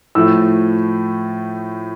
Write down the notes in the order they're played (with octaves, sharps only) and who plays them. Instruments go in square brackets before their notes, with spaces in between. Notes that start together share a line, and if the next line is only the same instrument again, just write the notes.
[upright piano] A2 F3 A3 E6